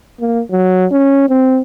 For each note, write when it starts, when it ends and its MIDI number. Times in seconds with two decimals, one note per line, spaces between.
0.20 0.41 58
0.51 0.85 54
0.91 1.29 61
1.29 1.61 60